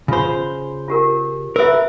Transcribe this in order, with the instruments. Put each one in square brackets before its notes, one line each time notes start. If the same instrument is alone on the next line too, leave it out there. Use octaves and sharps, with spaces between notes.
[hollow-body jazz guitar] C#3 C5 [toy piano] F4 B5
[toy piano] F4 G4 A#4
[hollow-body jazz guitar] A#4 B4 [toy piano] E5 E6